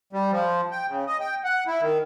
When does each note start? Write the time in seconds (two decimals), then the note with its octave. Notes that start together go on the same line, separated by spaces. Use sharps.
0.13 G3
0.32 F3
0.71 G5
0.88 C#3
1.07 D#5
1.20 G5
1.44 F#5
1.67 E4
1.81 D#3